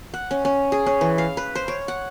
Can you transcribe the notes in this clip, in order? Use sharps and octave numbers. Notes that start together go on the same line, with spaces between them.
F#5
C#4
C#4
G#4
C#4
E3
F5
B4
C5
C#5
F#5